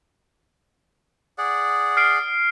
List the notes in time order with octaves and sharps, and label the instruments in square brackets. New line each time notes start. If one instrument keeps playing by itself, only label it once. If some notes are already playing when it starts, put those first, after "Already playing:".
[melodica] G#4 D5 F#5
[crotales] F6 C7 D7